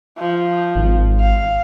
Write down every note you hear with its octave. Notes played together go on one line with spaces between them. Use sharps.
F3
G#1
F5